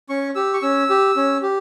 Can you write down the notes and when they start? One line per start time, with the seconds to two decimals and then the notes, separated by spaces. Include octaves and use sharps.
0.09 C#4 C#6
0.35 G4 E6
0.54 C#6
0.62 C#4 E6
0.90 G4
1.16 C#4
1.42 G4